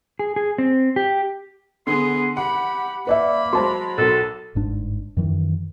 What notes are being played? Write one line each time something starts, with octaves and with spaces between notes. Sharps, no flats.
G#4
G#4
C4
G4
D3 B3 G#4 C6
G4 F#5 B5
A#3 B4 D5 E5 B5
F#3 G#3 C5 A5 C6
B1 F#3 A4
G1 G#2 D4
F#2 D#3 E3